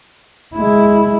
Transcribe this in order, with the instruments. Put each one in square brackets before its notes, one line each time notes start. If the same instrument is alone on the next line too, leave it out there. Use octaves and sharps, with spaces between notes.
[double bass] G#3 E4